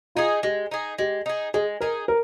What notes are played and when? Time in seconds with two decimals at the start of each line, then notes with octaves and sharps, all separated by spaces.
0.15 D#4 F4 G#4
0.43 G#3 G4
0.71 D#4 G#4
0.98 G#3 G4
1.26 D#4 G#4
1.54 G#3 G#4
1.81 D#4 G#4 A#4
2.08 A#4